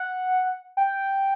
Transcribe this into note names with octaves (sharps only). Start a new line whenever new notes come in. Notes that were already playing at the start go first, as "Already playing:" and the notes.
Already playing: F#5
G5